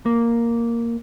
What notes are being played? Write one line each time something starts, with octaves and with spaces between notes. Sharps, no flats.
A#3